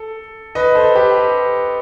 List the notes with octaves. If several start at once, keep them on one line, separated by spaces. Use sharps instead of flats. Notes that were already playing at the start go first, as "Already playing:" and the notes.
Already playing: A4
B4 D#5
A4 C5
G4 B4